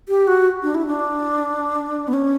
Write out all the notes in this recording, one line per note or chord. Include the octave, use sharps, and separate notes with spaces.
G4
F#4
D4
E4
D4
B3
C#4